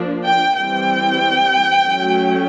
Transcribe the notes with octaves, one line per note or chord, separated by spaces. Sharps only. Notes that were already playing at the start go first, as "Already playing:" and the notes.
Already playing: F3 A#3 D4
G5
E3 G3 C4 G5
F#3 A3 C#4